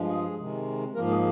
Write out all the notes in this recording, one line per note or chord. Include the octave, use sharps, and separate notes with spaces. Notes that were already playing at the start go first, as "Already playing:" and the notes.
Already playing: G2 F3 G#3
G#4
C3 D#3 G#3
G#2 F3 A#3 A#4
G#4